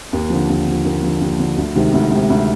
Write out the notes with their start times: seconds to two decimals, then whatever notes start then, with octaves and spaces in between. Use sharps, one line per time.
0.13 D#2
0.30 D3 F3
0.49 D#2
0.67 D3 F3
0.85 D#2
1.03 D3 F3
1.21 D#2
1.39 D3 F3
1.57 D2
1.75 C3 D#3 G#3
1.93 D2
2.11 C3 D#3 G#3
2.30 D2